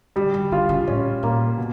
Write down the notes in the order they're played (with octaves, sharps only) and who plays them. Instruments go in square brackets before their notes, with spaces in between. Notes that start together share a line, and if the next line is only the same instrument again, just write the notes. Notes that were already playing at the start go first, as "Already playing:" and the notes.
[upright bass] D3 [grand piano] G3
[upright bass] D3
[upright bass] D3 [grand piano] F4
[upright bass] C#3
[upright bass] A2 [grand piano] C#4
[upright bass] A#2 [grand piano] A#3
[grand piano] B2